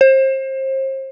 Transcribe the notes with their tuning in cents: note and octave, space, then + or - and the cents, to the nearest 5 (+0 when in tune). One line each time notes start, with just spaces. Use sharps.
C5 +30